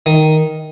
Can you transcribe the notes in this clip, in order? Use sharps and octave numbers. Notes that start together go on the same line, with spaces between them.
D#3